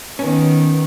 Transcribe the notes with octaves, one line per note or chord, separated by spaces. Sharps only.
D#3 B3 C#4